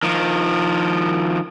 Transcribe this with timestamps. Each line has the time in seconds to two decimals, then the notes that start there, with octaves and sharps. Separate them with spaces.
0.03 D#3 F3